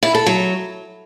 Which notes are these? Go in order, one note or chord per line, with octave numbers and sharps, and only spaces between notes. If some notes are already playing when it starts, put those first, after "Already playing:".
E4
A4
F#3